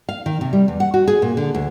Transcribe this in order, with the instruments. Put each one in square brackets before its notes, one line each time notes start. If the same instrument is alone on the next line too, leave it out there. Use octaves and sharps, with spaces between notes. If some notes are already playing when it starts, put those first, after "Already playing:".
[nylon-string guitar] F5
D#3
C3
G3
E2
F#5
F#4
G#4
A#2
D3
D2